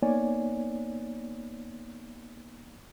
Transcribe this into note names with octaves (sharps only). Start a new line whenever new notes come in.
A#3 B3 D#4 C#5 D5 G#5